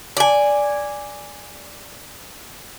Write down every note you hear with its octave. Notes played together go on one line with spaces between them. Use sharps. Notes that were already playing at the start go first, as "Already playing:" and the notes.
D5 G#5